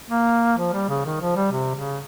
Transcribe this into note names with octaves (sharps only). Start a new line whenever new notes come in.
A#3
F3
G3
C#3
D#3
F3
G3
C3
C#3